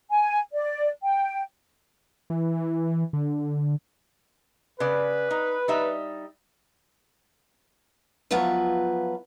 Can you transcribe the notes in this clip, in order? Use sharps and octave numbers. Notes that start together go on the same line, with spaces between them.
G#5
D5
G5
E3
D3
C#3 B4 D5
D#4
G3 D#4 E5
F3 F#3 B3 F4 B4 E5